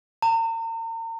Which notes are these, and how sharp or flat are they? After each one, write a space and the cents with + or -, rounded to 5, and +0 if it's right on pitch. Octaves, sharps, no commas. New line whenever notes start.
A#5 -40